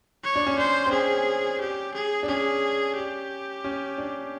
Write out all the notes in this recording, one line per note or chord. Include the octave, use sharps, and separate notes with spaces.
C#5
D4
C#4
D4 C5
C4
C#4 G#4
G4
G#4
D4
C#4 G#4
G4
C#4
D4